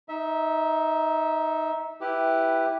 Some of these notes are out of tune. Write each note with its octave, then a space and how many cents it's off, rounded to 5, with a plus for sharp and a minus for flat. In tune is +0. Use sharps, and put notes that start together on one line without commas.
D#4 +10 E5 -20
E4 +0 G4 +0 B4 +0